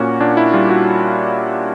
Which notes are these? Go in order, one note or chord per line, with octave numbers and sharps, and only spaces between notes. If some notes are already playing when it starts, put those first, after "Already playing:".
Already playing: A#2 A#3 C#4 F#4
A#2 D4
E4
G3 F4
F#4